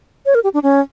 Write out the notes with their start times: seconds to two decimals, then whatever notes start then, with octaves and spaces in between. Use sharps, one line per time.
0.26 C#5
0.35 A#4
0.44 G4
0.54 D4
0.63 C#4